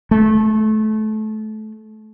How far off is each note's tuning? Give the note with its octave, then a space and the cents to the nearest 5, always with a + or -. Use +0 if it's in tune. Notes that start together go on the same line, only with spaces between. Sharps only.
A3 -25